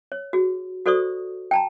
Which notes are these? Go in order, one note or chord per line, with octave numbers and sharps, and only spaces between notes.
C#5
F#4 G#4
F#4 A4 C5 D5 C#6 D#6
G5 A5 A#5